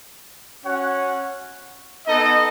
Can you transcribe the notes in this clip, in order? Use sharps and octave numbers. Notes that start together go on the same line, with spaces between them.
C#4 F#4 C#5 F#5
B3 D#4 A4 D#5